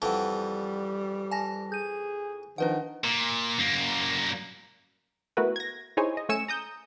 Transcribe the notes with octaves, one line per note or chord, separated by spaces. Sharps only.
F2 E3 G3 F#5 A5
G#5 A5 A#6
G#4 G6 D#7
D#3 F3 D4 B4 F#5
A#2
F#2 A#3
A3 B3 E4 F#4 A#4 B4
G#6 A#6
D#4 E4 G#4 C5 C#5 G#5
D#5
A3 C#4 G#5 E6 C#7 E7
A#5 D#6 G6